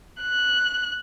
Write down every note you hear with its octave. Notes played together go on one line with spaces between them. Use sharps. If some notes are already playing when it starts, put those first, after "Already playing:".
F#6